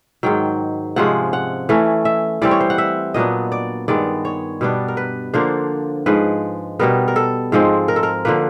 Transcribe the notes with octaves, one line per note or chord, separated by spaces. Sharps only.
G#2 D#3 F#3 G5
C3 F3 G#3 C#4 F#5
F#5
E3 A3 C#4
E5
E3 G3 C4 D5
C#5
C5
F#5
E5
A#2 F#3 B3 D4 D#5
D5
G2 D#3 G#3 B3 D5
C#5
B2 G3 B3 D4
A#4
B4
D3 F3 A#3 D4 C5
G#2 F3 G#3 B4
B2 G3 B3 A#4
A#4
A4
G#2 F3 G#3 C4
A#4
A4
A#4
D3 F3 A#3 B4